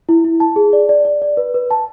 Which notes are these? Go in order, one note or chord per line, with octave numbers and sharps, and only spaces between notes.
E4
E4
A5
G#4
D5
D5
D5
D5
B4
B4
A5